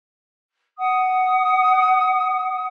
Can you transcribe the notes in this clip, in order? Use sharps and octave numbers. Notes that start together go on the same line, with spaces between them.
F#5 D#6